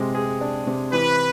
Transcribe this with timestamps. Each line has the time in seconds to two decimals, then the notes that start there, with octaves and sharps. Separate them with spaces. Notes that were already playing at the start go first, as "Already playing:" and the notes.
Already playing: C3 G#3
0.15 G#4
0.41 D4
0.67 C3
0.93 E3 B4